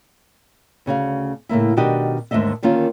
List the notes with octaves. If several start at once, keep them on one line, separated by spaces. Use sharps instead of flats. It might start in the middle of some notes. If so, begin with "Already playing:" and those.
D2 C#3 F#4 F5
A2 C#3 A#3 E4
B2 D#3 D4 F#4 G4 D#5
D#2 G#2 D3 A3 D#5 E5
D3 D#3 A#3 C#4 F4